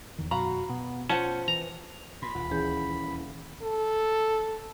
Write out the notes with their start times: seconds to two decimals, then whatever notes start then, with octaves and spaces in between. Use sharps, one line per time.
0.19 E2 D#3
0.31 F#2 B2 F#4 F5 A#5 B5
0.69 B2 B3
1.10 C#4 F4 C5 F#5 A5
1.48 E3 A#5
2.22 A#2 B5 C6
2.35 D#1 D2 F4
2.51 E3 C#4 E4 G#4 G6
3.63 A4